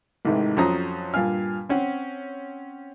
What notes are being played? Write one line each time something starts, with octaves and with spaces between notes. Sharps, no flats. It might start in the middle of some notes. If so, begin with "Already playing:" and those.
A1 G#2 C3 D#3 G#3
F2 F#3 C#4 C5 A#5 D#6
G2 A#2 F5 G#5 F6
C4 C#4 F#5